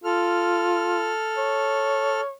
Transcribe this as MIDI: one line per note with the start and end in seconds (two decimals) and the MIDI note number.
0.04 1.11 65
0.04 2.21 69
0.04 2.21 89
1.37 2.33 73